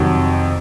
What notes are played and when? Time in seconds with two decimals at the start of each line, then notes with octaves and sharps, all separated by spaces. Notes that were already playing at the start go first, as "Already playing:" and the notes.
Already playing: F2 C3 D#3 F#3